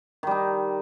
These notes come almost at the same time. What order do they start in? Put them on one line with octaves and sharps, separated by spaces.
D#3 G3 D#4